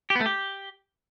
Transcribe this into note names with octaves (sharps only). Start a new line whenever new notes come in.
G4
B3
A3
G4